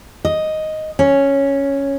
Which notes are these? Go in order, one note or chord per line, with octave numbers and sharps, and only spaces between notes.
D#5
C#4